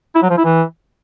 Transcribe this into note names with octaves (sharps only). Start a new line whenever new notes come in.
E4
F#3
F3
E4
E3